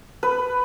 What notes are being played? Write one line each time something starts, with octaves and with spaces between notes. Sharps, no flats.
B4